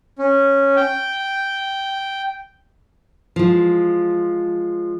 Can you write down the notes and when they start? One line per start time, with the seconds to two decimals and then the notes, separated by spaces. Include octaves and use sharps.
0.19 C#4
0.76 G5
3.36 F3 G#3